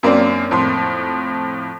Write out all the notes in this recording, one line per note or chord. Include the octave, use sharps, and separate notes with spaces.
F#2 A#3 C4 D4
F2 A2 C6